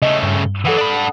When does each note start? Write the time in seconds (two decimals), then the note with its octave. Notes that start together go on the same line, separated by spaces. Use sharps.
0.02 C#3 A3 D#5
0.23 G2
0.65 E3 F#3 A4 F#5 D#6
0.77 D4 B5